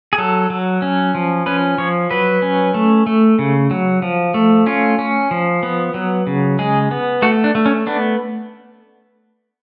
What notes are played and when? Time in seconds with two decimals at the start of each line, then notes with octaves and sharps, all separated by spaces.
0.13 G#4
0.18 F#3 A4
0.50 F#3
0.82 C#4
1.15 F3
1.46 C#4 B4
1.78 F3 C#5
2.11 F#3 B4
2.42 C#4
2.74 A3
3.06 A3
3.39 C#3
3.71 F#3
4.02 F3
4.34 A3
4.66 C#4 F4
4.99 C#4
5.31 F3
5.63 B3
5.94 F#3
6.27 C#3
6.59 G#3 G#4
6.91 B3
7.22 A3 F#4
7.44 D4
7.55 A3
7.66 C#4
7.87 B3 D4